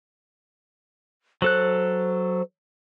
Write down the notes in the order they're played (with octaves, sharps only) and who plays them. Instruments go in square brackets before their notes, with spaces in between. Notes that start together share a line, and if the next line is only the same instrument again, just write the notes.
[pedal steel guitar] F#3 A4 F#6 [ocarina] C5